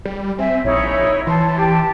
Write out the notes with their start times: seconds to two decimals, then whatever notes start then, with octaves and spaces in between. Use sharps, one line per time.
0.05 G3
0.39 C4 E5 G#5
0.65 A#1 D#4 E4 C#5
1.27 E3 A5 C6
1.56 G4 A5